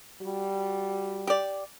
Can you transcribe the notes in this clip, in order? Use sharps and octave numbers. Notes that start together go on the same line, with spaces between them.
G3 F#4
G4 D5